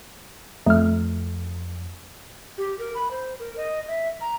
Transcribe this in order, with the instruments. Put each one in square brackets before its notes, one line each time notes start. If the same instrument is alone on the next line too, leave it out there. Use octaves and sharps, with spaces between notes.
[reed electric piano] F2 [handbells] A3 F6
[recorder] G4
A#4
B5
C5
A#4
D#5
E5
A#5